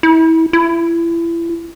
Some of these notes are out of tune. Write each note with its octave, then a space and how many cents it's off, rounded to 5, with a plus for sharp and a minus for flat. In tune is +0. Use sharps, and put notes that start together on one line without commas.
E4 -25
E4 +30